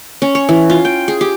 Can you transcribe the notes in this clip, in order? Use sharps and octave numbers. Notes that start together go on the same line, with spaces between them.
C#4
C#5
E3
F4
G5
G#4
G4